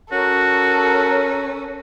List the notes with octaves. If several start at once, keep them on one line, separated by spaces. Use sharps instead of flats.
C#4 F#4 A4 A#4